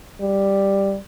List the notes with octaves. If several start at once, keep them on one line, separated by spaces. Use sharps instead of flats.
G3